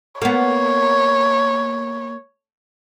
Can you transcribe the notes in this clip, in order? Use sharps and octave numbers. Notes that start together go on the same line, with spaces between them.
A#3 B3 C#5